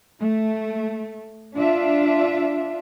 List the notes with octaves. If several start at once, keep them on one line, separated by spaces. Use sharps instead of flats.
A3
D4 F4 E5